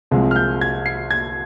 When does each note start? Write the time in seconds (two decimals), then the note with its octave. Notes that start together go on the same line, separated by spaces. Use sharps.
0.11 C2 C3 F3 G#3
0.31 F6
0.36 G6
0.61 G#6
0.86 C7
1.11 G#6